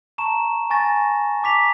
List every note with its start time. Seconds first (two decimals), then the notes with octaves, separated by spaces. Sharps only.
0.18 A5 A#5 C#6 E7
0.70 G#5 C#6 A6 A#6
1.42 A5 A#5 D6 B6 F7